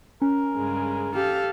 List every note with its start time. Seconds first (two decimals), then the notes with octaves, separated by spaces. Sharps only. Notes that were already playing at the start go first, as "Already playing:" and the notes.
0.22 C#4 A#4
0.54 G2 C#3 G#3
1.15 G4 A4 F5